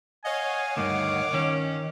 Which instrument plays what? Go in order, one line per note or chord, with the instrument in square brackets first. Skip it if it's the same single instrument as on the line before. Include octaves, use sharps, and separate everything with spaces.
[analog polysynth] C#5 F5 F#5 [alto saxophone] D#5 [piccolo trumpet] G#5
[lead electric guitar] D2 G2 [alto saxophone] D#3 [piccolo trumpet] D6
[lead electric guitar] D#3 [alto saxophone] C#4